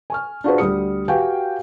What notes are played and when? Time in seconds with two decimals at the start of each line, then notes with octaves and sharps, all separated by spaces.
0.10 G#5 C#6 F6
0.44 D4 F4 F#4 G#4 B4 C5
0.58 D2 G3 D#6 C#7
1.08 F#4 G4 B4 F5 G5 G#5